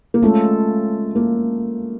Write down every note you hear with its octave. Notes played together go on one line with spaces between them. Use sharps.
A#3
G#3 A3 C#4 F4 A4
A#3